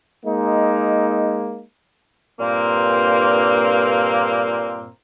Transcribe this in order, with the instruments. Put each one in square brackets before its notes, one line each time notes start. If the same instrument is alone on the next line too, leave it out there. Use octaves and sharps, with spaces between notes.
[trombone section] G#3 A#3 D#4
[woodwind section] G2 A#2 A#3 C4